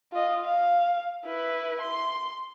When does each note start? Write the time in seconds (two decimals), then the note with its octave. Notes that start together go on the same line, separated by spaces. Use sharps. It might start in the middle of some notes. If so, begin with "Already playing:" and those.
0.12 F4 D#5
0.44 F5
1.26 E4 B4
1.81 C6